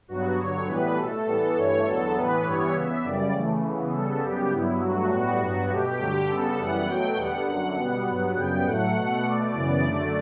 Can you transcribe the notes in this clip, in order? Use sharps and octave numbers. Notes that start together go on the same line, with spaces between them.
G2 F#3 B3 F#4
G2 D3 F#3 C#5
A2 E3 G3 B3 B4
B2 A3 A4
A2 E3 G3 B3
G2 E3 A3 C#5
E2 D3 F#3 B3 A4
A2 E3 G3 B3 B4
G2 E3 G3 B3 C#5
C#3 E3 B3 E5
F#2 C#3 G3 D5
C#3 E3 A3
C#3 E3 B3
C#3 G3 B3 A4
F#2 C#3 G3 B3 G4
G2 F#3 B3 E4
G2 F#3 A3 F#4
A2 G3 B3
G2 F#3 B3 F#4
B2 A3 G4
G2 D3 F#3 A3
C#3 G3 B3 A4
F#2 E3 G3 B3 F#5
B2 F#3 A3 G5
E2 D3 G3 B3 F#5
F#2 D3 F#3
B2 G3 B3
G2 F#3 B3
F#2 C#3 G3 B3 G5
A2 F#3 A3 F#5
B2 A3
B2 A3 D5
F#2 C#3 E3 B3
F#2 D3 A3